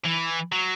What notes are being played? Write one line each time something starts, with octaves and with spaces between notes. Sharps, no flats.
E3
F#3